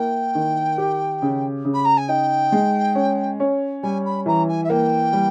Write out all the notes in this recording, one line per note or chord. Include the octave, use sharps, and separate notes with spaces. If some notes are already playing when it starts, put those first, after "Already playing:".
Already playing: A#3 E4 G5
D#3
G4
C#3
C#3
B5
A#5
G#5
D#4 G5
G#3
C#4
C#4
G3 G#5
B5
E3 A#5
G#5
E5
A#3 G5
G3